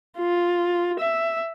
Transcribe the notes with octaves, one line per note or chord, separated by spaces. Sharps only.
F4
E5